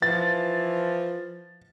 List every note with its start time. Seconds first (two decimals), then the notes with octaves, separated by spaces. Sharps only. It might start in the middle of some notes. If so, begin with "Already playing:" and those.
0.02 E3 F3 A6